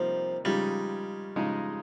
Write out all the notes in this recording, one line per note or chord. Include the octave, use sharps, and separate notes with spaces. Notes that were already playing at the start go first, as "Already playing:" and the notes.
Already playing: C3 F3 G3 A#3 D#4
C#3 F3 G3 G#3 D#4
C#3 F3 G#3 D#4